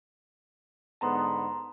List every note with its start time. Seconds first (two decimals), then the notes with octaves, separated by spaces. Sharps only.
1.01 G#2 D3 B3 A5 A#5 C6